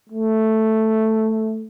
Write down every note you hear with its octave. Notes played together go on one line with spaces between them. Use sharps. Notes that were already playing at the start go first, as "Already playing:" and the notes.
A3